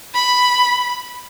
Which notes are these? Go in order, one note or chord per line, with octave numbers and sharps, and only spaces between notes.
B5